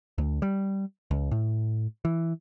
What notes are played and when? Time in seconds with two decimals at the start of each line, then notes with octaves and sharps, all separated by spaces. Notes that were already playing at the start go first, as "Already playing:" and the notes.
0.18 D2
0.42 G3
1.11 C#2
1.31 A2
2.05 E3